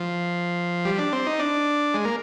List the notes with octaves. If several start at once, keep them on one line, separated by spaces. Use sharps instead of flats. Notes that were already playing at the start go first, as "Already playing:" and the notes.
Already playing: F3
G3
D4
C4
D#4
D4
G#3
A#3